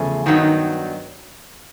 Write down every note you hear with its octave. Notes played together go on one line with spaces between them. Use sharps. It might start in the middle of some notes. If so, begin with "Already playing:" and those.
Already playing: E2 C#3 F3 A3 G#5
G2 D#3 F#3 B3 D#4